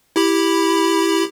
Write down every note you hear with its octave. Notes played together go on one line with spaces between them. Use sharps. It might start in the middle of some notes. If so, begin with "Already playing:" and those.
E4 G4 B5